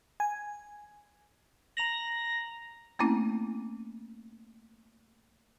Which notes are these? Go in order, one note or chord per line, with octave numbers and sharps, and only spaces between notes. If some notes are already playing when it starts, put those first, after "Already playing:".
G#5
A#5 A#6 F7 F#7
A3 A#3 C4 C#4 E4